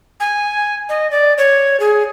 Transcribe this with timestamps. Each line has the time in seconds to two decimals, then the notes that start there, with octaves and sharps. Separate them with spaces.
0.20 G#5
0.89 D#5
1.11 D5
1.38 C#5
1.80 G#4